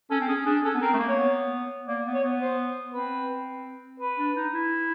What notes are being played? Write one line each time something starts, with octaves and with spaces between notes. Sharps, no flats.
C#4 A4
C4
C#4 G#4
D4 G#4
C#4 A4
B3
C4 A#4
A3
A#3
C#5
B3
A#3 D5
B3
C#5
B3
C5
C4 B4
B4
D4
D#4
E4